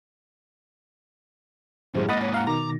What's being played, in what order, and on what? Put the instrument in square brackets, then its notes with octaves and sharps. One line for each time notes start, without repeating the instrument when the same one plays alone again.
[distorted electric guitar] F#2 [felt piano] A2 G3 G#3 [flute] C5
[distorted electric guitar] G#2 A#3 [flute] D#5 [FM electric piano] F#5 B5 D#6 [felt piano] A6
[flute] C#5
[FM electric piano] F5 F#5 [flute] A#5
[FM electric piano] B2 D#3 [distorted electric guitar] A#5 [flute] D6